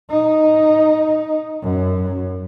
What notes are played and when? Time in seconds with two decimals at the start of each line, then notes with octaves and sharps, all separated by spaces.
0.10 D#4
1.62 F#2